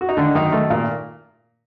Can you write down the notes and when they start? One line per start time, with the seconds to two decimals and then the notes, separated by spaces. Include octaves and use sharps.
0.01 F#4
0.09 D#4
0.17 D3 D#3 D4
0.35 F#2 D#3 D#4
0.52 D#3 A3
0.70 A#2 A#3